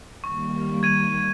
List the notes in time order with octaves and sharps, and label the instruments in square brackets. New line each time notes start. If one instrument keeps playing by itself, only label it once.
[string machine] D#3 G3 A#3 [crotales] C#6
[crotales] G#6 D#7